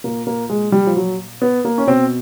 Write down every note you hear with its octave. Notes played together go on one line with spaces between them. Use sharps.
A#2 A#3
A#3
G#3
G3
F3
F#3
B3
A#3
C#4
B2 C4